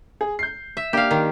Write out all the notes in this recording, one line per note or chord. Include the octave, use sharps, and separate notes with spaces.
G#4
G6 C7
E5
A#3 D4 G4 F5
D#3